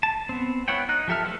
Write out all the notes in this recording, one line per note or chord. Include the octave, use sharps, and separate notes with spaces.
A5
B3 C4
B3 E4 C#5 F#5 G5
D#4 F#6
F3 G4 A4 E5 F6
A3 A4 B4 C5 F#5